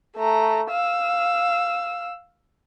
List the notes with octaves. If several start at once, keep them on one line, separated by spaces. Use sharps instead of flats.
A3 A#5
F5 E6